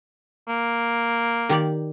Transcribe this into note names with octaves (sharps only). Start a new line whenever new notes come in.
A#3
D#3 G4 D5